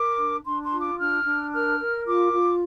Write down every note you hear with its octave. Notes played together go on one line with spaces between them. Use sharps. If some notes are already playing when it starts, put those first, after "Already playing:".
Already playing: A#4 D6
D4
D4 C6
C6
F4
D6
D4 F6
D4
A#4 F6
A#4
F4 D6
F4